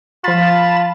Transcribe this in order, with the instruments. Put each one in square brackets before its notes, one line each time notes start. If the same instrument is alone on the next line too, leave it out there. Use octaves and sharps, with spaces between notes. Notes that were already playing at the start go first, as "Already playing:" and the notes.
[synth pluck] F3 C7 [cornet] F4 [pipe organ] A5 B5 A6